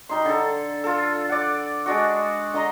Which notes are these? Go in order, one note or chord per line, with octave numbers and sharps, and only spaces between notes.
G3 D#4 C6
D3 A4
F4 A4
D5 F#5
G#3 D4 F#4
D3 D#5 A#5 C6